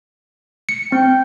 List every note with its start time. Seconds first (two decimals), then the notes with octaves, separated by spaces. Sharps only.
0.69 C#7
0.92 C4 G5